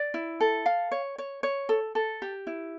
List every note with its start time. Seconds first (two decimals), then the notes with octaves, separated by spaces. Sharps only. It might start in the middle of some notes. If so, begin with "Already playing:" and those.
Already playing: D5
0.14 E4
0.40 A4
0.66 F5
0.91 C#5
1.18 C#5
1.43 C#5
1.69 A4
1.95 A4
2.22 G4
2.47 E4